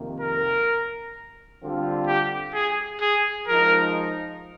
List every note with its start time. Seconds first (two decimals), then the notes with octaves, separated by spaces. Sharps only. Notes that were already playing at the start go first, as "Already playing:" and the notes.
Already playing: F2 C3 D#3 A#3
0.20 A#4
1.61 D3 G3 C4 F4
2.07 G4
2.54 G#4
3.01 G#4
3.47 F3 G#3 D#4 A#4